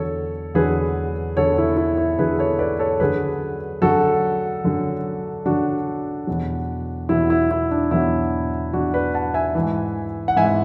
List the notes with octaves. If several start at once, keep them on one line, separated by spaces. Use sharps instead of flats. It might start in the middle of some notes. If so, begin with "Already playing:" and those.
Already playing: E2 D3 F#3 A4 C#5
E2 D3 F#3 G#4 B4
E2 D3 F#3 A4 C#5
E4
E4
E4
E2 D3 F#3 G#4 B4
A4 C#5
B4 D5
A4 C#5
F#2 D3 F#3 G#4 B4
F#2 D3 F#3 F#4 A4
F#2 D3 F#3
F#2 D3 F#3 D4 F#4
E2 B2 F#3
E2 B2 F#3 E4
E4
E4
D4
E2 B2 F#3 E4
E2 B2 F#3 D4 F#4
B4 D5
F#5 A5
E5 G#5
G#2 E3
F#5
G#2 E3 E5 G#5